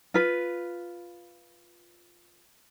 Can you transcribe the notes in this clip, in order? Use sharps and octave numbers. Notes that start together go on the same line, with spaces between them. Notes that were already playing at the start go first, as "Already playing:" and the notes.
F4 B4